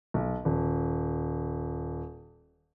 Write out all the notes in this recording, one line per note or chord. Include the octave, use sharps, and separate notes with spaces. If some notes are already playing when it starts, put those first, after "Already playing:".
B1
D#1